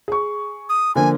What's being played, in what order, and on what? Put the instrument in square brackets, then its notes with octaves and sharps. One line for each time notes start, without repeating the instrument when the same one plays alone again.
[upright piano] G#4 C#6
[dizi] D#6
[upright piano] D3 F3 A#3 [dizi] G#5